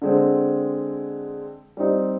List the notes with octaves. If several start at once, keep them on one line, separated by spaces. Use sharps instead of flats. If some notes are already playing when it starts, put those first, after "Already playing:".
D3 G#3 C4
G3 C4 D#4